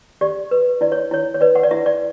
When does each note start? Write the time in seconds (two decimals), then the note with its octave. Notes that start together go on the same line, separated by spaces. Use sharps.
0.21 G4 D5
0.51 B4
0.81 E4 D5
0.92 C#5
1.11 E4 C#5
1.34 C#5
1.41 B4 D5
1.55 F#5
1.63 D5
1.71 E4 E5
1.86 D5